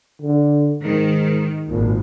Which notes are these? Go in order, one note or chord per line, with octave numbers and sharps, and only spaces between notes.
D3
G#2 D#3
G#1 A#2